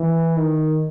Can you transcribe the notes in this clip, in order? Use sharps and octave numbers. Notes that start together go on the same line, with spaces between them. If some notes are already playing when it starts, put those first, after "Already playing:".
Already playing: E3
D#3